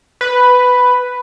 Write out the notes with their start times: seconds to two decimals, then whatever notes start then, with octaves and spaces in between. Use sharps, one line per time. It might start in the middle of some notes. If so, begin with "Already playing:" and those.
0.21 B4